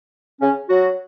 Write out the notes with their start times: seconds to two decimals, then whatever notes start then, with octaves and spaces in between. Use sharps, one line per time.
0.41 C#3 C#4
0.69 F#3 F#4